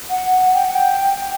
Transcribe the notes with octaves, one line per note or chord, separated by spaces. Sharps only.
F#5
G5
F#5
G5
G5